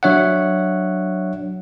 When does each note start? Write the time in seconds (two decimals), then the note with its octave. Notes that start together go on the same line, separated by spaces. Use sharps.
0.03 F#3 D4 C#5 E5 F#5